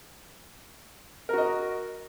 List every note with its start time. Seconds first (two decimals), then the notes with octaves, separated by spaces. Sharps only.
1.29 A#4
1.33 F#4
1.38 D#5